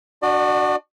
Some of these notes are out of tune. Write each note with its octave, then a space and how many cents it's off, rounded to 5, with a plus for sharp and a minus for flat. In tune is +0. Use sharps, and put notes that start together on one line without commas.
D4 +0 F#4 +0 D5 +40